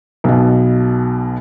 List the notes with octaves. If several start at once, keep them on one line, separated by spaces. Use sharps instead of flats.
B1 B2